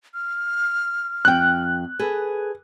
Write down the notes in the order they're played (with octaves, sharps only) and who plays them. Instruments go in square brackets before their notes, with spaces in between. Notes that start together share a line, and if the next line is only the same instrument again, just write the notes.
[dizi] F6
[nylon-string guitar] F2 G5 [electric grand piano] F#6
[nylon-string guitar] G#4 A4 B4